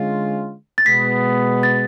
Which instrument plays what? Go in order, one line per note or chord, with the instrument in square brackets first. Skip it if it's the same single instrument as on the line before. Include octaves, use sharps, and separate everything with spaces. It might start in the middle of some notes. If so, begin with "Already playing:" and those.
Already playing: [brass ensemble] D3 G#3 C#4 F4
[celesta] A6
[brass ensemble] B2 G#3 B3 [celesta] B6
[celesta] A6